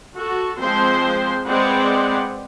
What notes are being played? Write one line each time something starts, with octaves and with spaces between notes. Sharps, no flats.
F#4 A4
F3 G#3 C4 C5 C6
G#3 C4 B4 D5 F#5